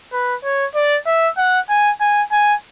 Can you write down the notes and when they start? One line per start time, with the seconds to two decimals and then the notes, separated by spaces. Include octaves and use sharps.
0.13 B4
0.44 C#5
0.75 D5
1.07 E5
1.38 F#5
1.69 G#5
2.00 G#5
2.32 G#5